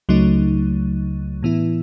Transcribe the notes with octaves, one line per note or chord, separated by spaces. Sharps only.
C#2 C#3 F#3 A3 D#4
A2 E3 B3 E4